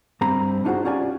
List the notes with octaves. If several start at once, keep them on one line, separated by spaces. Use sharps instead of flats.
G2 C4 A#5 B5
D4 D#4 F4 F#4 G#4 C5
C#4 F4 G4 D5 G#5